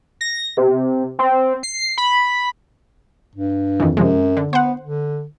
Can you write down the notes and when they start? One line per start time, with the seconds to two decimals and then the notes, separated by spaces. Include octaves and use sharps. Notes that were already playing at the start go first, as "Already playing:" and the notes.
0.21 A#6
0.57 C3
1.19 C4
1.63 C7
1.98 B5
3.36 G2
3.80 F2 D#3 E3
3.97 F#2 C3 F3 G#3
4.37 D3
4.53 B3 C5 F#5
4.82 D3